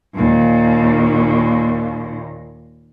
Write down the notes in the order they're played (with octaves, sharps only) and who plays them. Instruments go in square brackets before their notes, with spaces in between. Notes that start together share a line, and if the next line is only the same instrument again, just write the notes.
[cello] D#2 A#2